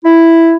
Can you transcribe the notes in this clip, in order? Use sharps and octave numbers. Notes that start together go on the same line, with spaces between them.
E4